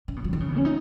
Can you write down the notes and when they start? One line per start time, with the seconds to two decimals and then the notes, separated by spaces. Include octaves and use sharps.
0.08 C#3
0.16 B2
0.24 F#3
0.33 D#3
0.40 C#3
0.48 B2
0.57 C#4
0.65 D#4